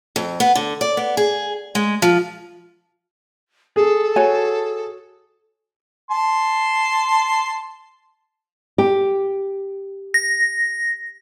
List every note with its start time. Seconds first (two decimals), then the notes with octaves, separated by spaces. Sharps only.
0.16 F2
0.40 B3
0.55 D3
0.81 D5
0.97 B3
1.17 G#4
1.75 G#3
2.02 F3
3.76 G#4 A4
4.16 F#4 C#5 G#5
6.11 A5 C6
8.78 G4
10.14 A#6